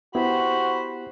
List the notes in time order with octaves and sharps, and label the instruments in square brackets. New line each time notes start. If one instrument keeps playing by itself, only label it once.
[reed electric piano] B3 E4 G4 [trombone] F#4 [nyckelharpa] C5 B5